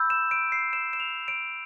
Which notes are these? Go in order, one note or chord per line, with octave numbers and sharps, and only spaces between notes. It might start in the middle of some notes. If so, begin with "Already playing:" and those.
Already playing: B5 E6 G6
E7
D7
C7
E7
E7
F7
D7